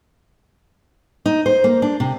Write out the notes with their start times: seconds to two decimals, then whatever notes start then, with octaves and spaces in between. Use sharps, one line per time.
1.26 D#4
1.46 C5
1.64 A#3
1.82 D4
2.00 C3